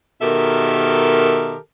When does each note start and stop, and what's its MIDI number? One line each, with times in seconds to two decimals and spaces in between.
0.22 1.57 47
0.22 1.57 51
0.22 1.57 67
0.22 1.57 69
0.22 1.57 70
0.22 1.57 76